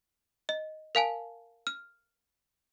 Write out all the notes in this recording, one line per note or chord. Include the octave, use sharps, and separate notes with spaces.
D#5
A#4 F5 G#5 A5
F6